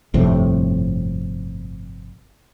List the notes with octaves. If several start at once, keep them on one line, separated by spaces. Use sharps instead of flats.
G1 F2 A2 C3